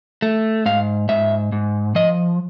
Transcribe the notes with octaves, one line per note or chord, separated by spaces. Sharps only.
A3
G#2 F5
G#2 E5
G#2
F3 D#5